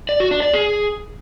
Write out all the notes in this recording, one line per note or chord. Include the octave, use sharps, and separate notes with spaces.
D5
F#4
D4
D5
G#4